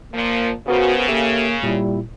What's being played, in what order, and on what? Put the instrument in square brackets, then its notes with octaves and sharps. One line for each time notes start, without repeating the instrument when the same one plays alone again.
[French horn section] A#2 F3 [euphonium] A#3
[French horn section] C#3 [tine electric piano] B3 A#4 C5 [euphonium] F#4
[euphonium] A#3 [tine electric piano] G4 A4 E5
[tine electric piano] A#2 E4 [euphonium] G3